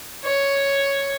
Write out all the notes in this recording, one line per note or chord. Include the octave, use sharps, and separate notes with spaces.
C#5